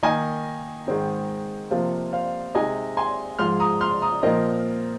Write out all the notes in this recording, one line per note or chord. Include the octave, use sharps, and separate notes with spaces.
D#3 A#3 D#4 D#5 G#5
G#2 D#3 G#3 C4 D#4
C3 F3 A#3 C5 F5
C5 F5
C3 G#3 D#4 D#5 G#5
G#5 C6
G#2 F3 G#3 C6 F6
A#5 D#6
C6 F6
A#5 D#6
A#2 F3 C4 A#4 D#5